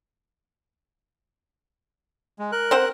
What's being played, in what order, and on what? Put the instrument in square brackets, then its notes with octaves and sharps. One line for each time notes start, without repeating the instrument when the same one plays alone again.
[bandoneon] G#3
A#4 F#6
[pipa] C4 C5 F#5